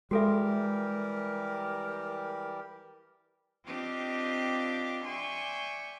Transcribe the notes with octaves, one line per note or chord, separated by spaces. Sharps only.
E3 G3 G#3 F#4 G4 A4 A#4 E5
C4 D4 F4 G4 D#5 G5
D5 E5 G5 G#5 C6 C#6